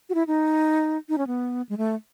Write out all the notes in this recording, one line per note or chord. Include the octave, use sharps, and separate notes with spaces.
F#4
E4
D#4
D#4
C#4
B3
G#3
A3